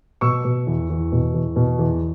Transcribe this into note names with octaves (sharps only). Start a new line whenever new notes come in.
B2 C#6 E6
B2
E2
E2
B2
E2
B2
E2